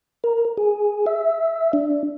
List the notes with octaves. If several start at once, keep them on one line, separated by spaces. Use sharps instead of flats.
A#4
G#4
E5
D4